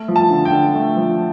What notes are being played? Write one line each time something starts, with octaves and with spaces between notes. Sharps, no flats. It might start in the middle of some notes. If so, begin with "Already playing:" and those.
Already playing: A3
F3
A5
D3
G5
D3
A3
F3